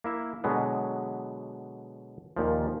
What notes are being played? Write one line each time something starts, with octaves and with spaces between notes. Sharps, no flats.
A#3 E4 E5
B2 D3 F#3 G#3 B3
D#2 A#2 F3